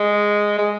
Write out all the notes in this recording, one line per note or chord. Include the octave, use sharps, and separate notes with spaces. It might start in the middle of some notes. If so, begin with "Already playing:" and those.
Already playing: G#3
G#3